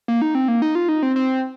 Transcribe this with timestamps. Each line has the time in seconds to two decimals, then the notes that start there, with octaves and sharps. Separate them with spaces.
0.08 A#3
0.22 D#4
0.35 C4
0.48 A#3
0.62 D#4
0.75 F4
0.89 D#4
1.03 C4
1.16 C4